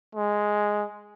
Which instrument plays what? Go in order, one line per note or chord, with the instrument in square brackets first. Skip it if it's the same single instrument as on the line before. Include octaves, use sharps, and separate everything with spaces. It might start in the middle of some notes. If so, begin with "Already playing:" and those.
[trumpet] G#3